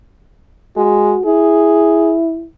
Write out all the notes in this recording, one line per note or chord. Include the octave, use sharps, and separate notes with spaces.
G#3 F#4
E4 G#4